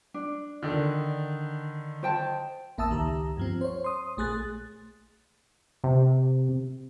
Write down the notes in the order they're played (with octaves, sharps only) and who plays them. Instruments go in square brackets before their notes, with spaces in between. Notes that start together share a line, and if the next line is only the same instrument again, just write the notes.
[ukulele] D4
[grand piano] D3 D#3
[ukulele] C5 G5 A5
[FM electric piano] A1 A#3 E5 A5 D#6 E6
C#2 D#3 G4 A#5
G2 F3 C4
C5 C#5
C6 D#6
A#1 A3 G#4 F#6 A6
[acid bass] C3